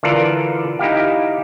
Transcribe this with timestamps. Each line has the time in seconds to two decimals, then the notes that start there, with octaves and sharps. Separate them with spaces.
0.03 D3 E3 F4 A4 A#4 D5
0.79 D#4 E4 G4 F5